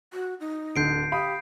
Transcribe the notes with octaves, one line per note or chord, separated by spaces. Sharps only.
F#4
D#4
D1 D3 G6 C7 D7
G4 F5 B5 D#6